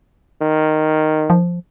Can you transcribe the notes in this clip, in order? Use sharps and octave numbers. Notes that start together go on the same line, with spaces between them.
D#3
F3